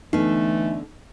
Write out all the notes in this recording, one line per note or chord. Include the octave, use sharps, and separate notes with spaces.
D3 E3 A3 B3 D#4